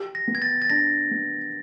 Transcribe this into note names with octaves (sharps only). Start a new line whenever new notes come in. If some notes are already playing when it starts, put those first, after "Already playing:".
Already playing: G4
A#6
B3
G#6
A6
A6
D4 A#6
B3